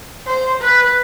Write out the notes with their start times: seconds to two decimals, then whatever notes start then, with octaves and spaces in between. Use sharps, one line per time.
0.27 C5
0.62 B4